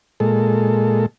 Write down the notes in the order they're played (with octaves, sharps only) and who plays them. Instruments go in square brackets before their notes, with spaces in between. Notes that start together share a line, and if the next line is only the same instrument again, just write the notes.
[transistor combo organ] A#2 G#3 A4